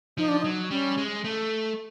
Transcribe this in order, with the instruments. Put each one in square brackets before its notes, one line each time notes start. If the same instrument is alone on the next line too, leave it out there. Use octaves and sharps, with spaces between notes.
[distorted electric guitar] F3 [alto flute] D#4
[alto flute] D4
D#4
[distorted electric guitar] F#3
[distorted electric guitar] G3 [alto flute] C#4
[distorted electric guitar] G#3
A3